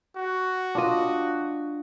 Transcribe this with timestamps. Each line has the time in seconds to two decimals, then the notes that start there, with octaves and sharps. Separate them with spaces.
0.16 F#4
0.75 D4 F4 D#5